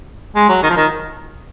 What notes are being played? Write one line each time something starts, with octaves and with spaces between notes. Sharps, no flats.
G#3
F#3
D#3
F3
D#3